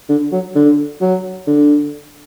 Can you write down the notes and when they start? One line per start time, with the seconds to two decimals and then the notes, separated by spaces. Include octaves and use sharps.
0.09 D3
0.32 F#3
0.55 D3
1.01 F#3
1.47 D3